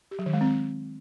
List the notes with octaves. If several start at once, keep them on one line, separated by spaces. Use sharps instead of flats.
G4
F#3
D#3
G#3
C4